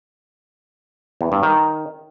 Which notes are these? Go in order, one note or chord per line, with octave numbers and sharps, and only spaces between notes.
E2
G2
D#3